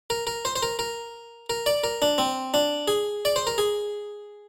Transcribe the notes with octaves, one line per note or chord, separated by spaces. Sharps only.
A#4
A#4
C5
C5
A#4
A#4
A#4
D5
A#4
D4
C4
D4
G#4
D5
C5
A#4
G#4